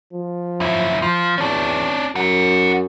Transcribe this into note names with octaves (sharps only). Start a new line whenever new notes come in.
F3
F#2 E4
F3
E2 C#4 D4
F#2 D#4 F#5